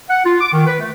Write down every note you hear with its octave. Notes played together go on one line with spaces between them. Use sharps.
F#5
F4
D6
D#3
B4
A3